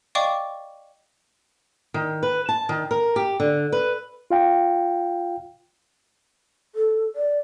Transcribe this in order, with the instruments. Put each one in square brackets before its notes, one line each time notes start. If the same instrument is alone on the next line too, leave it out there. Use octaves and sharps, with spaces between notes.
[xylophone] D5 D#5 F5 G5 C#6 D6
[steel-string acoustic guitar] D#3
B4
A5
D#3
A#4
G4
D3
B4
[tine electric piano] F4 F5 G5
[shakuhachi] A4
D5